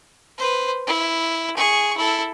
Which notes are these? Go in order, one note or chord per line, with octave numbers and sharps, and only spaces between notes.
B4 C5
E4
G#4 C#6
E4 A4